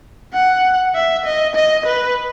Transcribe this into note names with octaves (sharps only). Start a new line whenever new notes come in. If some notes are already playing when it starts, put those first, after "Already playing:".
F#5
E5
D#5
D#5
B4